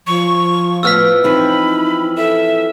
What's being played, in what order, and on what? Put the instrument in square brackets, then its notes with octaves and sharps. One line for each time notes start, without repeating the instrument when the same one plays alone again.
[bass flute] F3 [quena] C#6
[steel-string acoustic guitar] A2 B3 F4 [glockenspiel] E6 F6 B6
[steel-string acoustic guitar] E3 F3 C4 [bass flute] D#4 [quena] B5
[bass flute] A4 [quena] E5